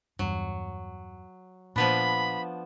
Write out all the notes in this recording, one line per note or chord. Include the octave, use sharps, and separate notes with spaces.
E2 G2 F#3
A#2 F3 B3 D4 B5